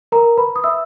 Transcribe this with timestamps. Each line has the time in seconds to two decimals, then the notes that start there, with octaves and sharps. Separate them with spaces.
0.12 A#4 A#5
0.37 B4 B5
0.56 D#6
0.64 E5 E6